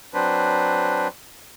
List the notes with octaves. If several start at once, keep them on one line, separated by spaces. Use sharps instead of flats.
F#3 C4 D4 B4 C5